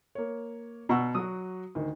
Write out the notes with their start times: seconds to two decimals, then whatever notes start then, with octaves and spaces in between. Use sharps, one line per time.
0.15 A#3 C#5
0.89 B2 F#5 A#5 C#6 E6
1.15 F#3 F#4 D#6
1.75 D2 D#3